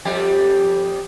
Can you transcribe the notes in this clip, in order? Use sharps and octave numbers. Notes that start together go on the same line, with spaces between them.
F2 G3 G4